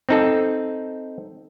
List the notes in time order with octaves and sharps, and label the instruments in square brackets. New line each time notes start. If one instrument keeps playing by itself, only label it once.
[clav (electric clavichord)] C4 D#4 A4